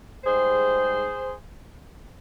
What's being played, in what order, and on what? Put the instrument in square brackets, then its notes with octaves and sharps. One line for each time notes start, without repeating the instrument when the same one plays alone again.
[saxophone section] G#2 G3 G#4 C5